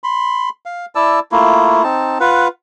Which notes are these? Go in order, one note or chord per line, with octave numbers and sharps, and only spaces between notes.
B5 C6
F5
E4 D5 A5 E6
A3 A#3 E4 F4
C4 D#4 A5
F4 B4 F#5